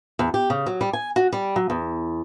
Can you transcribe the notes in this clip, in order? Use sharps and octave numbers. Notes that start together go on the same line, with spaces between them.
E2
G4
C#3
F#3
G3
G#5
F#4
G3
F#3
E2